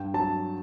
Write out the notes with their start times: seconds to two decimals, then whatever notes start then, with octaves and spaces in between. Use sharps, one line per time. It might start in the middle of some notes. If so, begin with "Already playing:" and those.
Already playing: G2 G5
0.14 F#3 A5